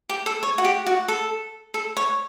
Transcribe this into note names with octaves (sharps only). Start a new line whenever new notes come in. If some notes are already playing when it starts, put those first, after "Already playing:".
G4
A4
C#5
F#4
G4
F#4
A4
A4
C#5